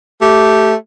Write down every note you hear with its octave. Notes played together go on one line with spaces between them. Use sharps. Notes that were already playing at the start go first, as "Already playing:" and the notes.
A3 G4